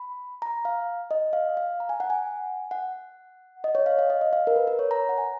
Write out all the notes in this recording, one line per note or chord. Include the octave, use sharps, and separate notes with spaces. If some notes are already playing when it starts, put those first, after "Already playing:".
Already playing: B5
A#5
F5
D#5
F5
F5
A#5
G#5
F#5
G#5
F#5
D#5
C#5
F5
F5
D#5
D#5
F5
A#4
B4
A#4
C#5
A#5
F#5
G#5